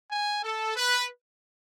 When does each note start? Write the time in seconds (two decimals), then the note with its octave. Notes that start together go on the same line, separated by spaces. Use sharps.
0.10 G#5
0.43 A4
0.76 B4